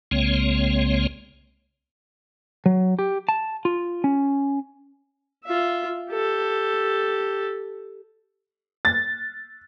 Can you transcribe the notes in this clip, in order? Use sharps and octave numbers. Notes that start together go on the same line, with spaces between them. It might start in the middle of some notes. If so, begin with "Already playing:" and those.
C2 C#3 G#3 A#3 C4 C#5
F#3
G4
A5
F4
C#4
F4 E5
G4 A4
A6